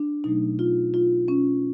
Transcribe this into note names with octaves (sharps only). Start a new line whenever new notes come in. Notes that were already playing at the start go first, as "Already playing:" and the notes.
Already playing: D4
B2 F#3 A3 D#4
F4
F4
C#4